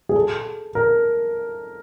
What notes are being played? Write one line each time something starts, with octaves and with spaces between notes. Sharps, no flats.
G#4
A4
A#4